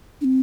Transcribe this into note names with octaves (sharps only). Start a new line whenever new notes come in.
D4
C4